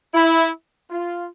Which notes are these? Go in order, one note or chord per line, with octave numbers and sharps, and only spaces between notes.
E4
F4